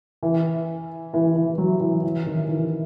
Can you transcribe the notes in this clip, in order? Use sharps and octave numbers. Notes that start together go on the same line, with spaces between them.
E3
E3
E3
F#3
E3
E3
D#3
E3